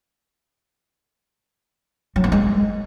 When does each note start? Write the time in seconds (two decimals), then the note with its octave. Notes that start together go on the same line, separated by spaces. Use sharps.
2.16 F#3
2.24 B3
2.32 G#3